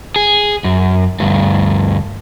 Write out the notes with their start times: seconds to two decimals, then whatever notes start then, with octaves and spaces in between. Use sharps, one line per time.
0.16 G#4
0.64 F#2
1.20 D2 G2